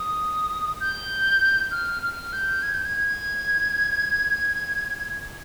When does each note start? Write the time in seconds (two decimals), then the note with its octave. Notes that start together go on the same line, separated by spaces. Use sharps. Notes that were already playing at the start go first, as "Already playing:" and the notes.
Already playing: D#6
0.80 G6
1.71 F6
2.02 F6
2.33 G6
2.63 G#6
2.74 G6
2.85 G#6